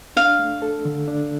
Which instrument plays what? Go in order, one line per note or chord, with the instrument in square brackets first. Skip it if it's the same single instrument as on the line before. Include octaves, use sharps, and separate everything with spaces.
[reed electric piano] D4 [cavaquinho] F5
[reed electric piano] A3
A4
D3
D4